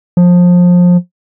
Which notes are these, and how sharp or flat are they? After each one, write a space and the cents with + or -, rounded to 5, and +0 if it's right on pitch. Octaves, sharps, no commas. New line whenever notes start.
F3 +25